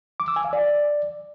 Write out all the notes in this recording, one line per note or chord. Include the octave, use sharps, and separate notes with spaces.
D6
E6
G#5
F5
D5